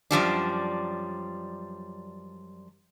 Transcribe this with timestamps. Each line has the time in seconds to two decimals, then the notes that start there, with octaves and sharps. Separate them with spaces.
0.11 F#2 F3 G3 D4